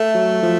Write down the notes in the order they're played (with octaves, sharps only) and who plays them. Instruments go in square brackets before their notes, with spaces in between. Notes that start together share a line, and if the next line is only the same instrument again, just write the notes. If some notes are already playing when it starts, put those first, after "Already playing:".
Already playing: [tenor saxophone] A3
[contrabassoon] F#3
F3